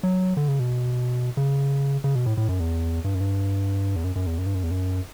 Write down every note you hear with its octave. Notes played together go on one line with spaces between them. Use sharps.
F#3
D3
C#3
B2
C#3
C#3
B2
A2
A2
F#2
E2
G2
F#2
G2
E2
F#2
F#2
E2
F#2
G2
F#2
E2
F#2